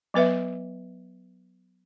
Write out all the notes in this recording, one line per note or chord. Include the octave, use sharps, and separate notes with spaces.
F#3 B3 B4 E5